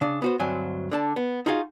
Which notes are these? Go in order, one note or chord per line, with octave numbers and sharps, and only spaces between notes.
C#3 D4
B3 F#4 C5
D2 G2 F#3 C4 G#5
D3 D4 A5
B3
D#4 F4 F#4 G#4 F5